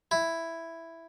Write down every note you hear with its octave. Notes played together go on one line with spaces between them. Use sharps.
E4